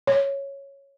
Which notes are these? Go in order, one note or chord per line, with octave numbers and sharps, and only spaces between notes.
C#5